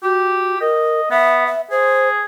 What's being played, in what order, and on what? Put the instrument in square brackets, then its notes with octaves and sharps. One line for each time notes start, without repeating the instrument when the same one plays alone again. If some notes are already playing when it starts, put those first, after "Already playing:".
[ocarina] F#4 [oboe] G4
[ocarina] A#4 [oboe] D#5
[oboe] B3 [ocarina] E5
[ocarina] E5
[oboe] G#4 [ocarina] C5